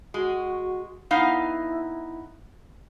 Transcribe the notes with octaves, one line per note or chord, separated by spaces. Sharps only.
G#3 F#4
B3 D#4 E4 F5